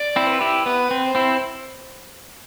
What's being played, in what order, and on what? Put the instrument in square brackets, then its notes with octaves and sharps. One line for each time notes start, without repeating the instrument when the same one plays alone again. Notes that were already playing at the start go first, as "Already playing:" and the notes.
Already playing: [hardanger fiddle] D5
[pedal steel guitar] C4 E4
[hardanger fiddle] B4
[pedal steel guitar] E4 G4
[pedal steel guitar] B3 [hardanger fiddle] B4
[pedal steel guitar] C4
[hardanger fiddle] C5
[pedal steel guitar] C4 E4